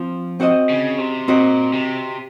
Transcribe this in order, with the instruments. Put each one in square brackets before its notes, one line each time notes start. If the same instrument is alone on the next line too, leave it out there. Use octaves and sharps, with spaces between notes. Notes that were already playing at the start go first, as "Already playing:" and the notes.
Already playing: [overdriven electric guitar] F3 [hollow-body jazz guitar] C4 F4
[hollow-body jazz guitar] C4 F#4 C5 D#5
[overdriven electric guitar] C#3
C3
[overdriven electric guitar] A#2 [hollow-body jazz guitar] C4 F#4 C5 D#5
[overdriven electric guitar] C3